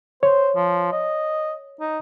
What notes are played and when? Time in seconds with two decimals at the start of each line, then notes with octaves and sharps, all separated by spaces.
0.23 C5 C#5
0.56 F3
0.92 D#5
1.81 D#4